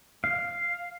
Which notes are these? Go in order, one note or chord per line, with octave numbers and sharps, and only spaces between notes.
F5